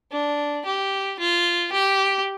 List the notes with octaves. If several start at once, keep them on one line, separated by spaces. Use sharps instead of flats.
D4
G4
F4
G4